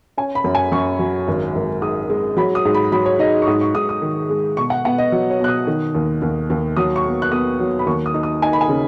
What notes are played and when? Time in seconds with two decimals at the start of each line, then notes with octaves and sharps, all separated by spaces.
0.17 C#4 G#5
0.35 B5
0.44 F#2
0.55 G#5
0.72 F#2 C#6
0.99 F#3
1.28 G#1
1.55 G#1
1.82 G#2 D#6
2.10 G#3
2.37 F#3 B5
2.55 D#6
2.65 G#2
2.74 B5
2.92 F#3 B5
3.06 C#5
3.19 D#4 D#5
3.42 C#6
3.47 G#2 D#6
3.61 C#6
3.75 G#2 D#6
3.89 D#6
4.02 D#3
4.30 G#3
4.57 B2 C#6
4.70 F#5
4.85 B3 F#5
4.98 D#5
5.12 F#3
5.30 C#5
5.40 B2 F#6
5.48 D#6
5.67 D#3
5.95 D#2
6.22 D#2
6.50 D#2
6.77 F#3 D#6
6.96 C#6
7.05 B3
7.22 F#6
7.31 B3 D#6
7.60 F#3
7.79 B5
7.86 D#2 C#6
8.06 D#6
8.14 D#4
8.23 D#6
8.42 D#4 G#5
8.53 B5
8.61 G#5
8.69 C#3